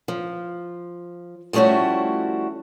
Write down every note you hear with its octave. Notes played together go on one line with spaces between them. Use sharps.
F3
F3 G3 A3 C#4 E4 F#4